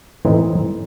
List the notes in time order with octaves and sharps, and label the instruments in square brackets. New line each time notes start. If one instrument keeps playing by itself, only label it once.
[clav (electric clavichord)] A2 E3 C4 D#4